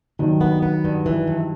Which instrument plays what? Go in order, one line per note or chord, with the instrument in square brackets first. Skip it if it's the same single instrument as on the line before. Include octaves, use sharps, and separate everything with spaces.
[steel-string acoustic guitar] G2 [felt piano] D#3 F#3
[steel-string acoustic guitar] B3
B3
G2
E3
G2